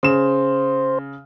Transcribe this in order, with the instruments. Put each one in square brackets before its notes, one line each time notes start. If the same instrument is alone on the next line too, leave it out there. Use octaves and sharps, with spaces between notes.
[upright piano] C#3 E7 [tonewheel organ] C5